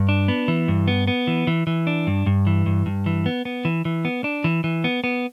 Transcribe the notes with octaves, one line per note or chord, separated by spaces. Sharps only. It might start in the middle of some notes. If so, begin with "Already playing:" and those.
Already playing: G2
D4
B3
E3
G2
B3
B3
E3
E3
E3
D4
G2
G2
E3
G2
G2
E3
B3
B3
E3
E3
B3
D4
E3
E3
B3
B3